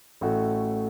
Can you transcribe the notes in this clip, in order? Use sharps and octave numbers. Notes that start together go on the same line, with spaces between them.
A1 A2 A3 F#4